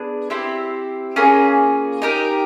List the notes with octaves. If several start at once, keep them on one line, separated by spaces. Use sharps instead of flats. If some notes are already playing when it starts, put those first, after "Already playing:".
Already playing: B3 D4 G#4
C4 E4 G4 C5
A#3 C#4 F4 G#4
D#4 G4 A#4